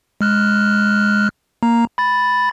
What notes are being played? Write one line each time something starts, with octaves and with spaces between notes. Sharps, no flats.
G#3 F6 F#6
A#3 A#5
B5 A6